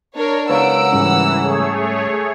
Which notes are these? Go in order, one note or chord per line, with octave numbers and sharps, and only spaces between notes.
D4 A#4 C#5
C#2 A#4 B4 C#5 F5 F#5 E6 D7
G#2 E3 G3 C#4
A3 G#4 C#5